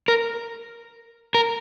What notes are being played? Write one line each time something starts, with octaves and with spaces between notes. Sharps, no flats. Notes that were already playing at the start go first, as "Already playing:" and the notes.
A#4
A#4